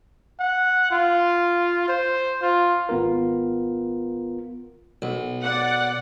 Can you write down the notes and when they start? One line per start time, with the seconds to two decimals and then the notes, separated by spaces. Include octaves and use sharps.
0.40 F#5
0.91 F4
1.88 C5
2.42 F4
2.89 G#1 B3 F4 A#4
5.02 B1
5.42 D5 F#5